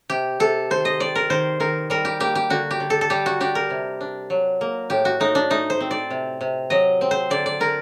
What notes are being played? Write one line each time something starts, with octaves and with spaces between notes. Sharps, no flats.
C3 G4
C3 A4
D#3 C5
D#5
G3 D5
A#4
D#3 C5
D#3 A#4
G3 A#4
G4
A#3 G4
G4
D3 F#4
G4
D3
A4
A4
G3 G4
F#4
D4 G4
A#4
C3
D4
F#3
A#3
A2 G4
F#4
A2 D#4
D4
A3 D#4
C5
C4
D5
C3
C3
F#3 D#5
C4
C5
D3 D5
D5
D3 A#4